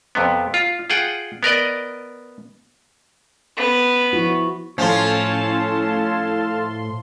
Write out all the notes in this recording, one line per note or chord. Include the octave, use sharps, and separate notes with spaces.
F2 C3 B3
F4
F4 G#4 F#5 G5
B3 A#4 D5 D#5
B3
F3 E4 F#4
A2 F3 C#4 A4 F5 A5 C6